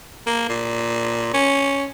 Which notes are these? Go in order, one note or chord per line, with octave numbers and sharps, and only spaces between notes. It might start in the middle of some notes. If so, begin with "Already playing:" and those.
A#3
A#2
C#4